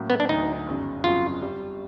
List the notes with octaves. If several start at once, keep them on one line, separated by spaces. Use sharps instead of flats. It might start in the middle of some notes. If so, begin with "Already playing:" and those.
Already playing: A2 F#3 A#3 C#4
B3
D4
D2 D3 F#3 D#4
G1 F#2 C#3
G1 F2 C#3 F#3 F4
G3